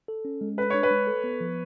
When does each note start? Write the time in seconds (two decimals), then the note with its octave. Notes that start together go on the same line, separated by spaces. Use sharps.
0.08 A4
0.25 C#4
0.41 G#3
0.58 A4 B4
0.70 D4 C#5
0.83 B4
0.91 G#3
1.07 A4
1.24 B3
1.41 F3